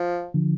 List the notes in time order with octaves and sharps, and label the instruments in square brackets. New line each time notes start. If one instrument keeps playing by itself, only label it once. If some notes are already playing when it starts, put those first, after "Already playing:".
Already playing: [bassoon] F3
[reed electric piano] D3 F3